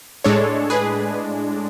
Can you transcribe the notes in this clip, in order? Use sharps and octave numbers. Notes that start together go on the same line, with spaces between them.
A2 G#3 D4 A4 C#5
G#4 B4